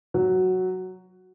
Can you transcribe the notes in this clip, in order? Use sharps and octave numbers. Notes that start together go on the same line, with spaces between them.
F#3